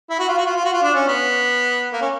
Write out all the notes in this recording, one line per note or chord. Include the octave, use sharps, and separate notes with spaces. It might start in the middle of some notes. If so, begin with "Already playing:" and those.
E4
F#4
F4
F#4
F4
F4
F#4
F4
D4
C#4
B3
A#3
C#4